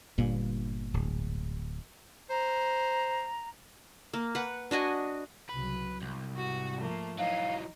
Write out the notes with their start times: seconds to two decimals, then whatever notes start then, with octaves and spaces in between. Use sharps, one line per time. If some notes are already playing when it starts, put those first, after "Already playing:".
0.18 G1 G2 A#2 A#3
0.94 D1
2.30 C5 A#5
4.13 A#3
4.35 B4 F#5
4.71 D4 F#4 D#5 G#5
5.49 C2 C#3 F#3 B4
6.02 C2 G#2
6.37 F#4
6.78 F3 A3 A#3
7.18 E3 F#3 D#4 F5